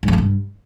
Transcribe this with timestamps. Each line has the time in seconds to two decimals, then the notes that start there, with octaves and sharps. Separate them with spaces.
0.03 G#2
0.08 F2
0.13 A#2
0.18 G2